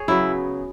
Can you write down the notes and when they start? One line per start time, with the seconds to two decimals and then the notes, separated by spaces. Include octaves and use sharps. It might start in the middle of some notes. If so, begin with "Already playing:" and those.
Already playing: G#4 C#5
0.08 C#3 F#3 B3 E4